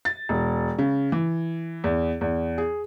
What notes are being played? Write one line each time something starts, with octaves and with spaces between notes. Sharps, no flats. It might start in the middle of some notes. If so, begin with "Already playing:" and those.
A6
E1
C#3
E3
E2
E2
G#4